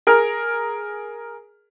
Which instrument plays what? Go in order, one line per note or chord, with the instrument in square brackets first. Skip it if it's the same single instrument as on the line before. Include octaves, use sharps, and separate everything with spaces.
[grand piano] G#4 A#4 F6